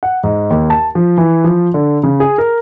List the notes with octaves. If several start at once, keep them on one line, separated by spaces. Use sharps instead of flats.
F#5
G#2
D#2
A5
F3
E3
F3
D3
C#3
G#4
A#4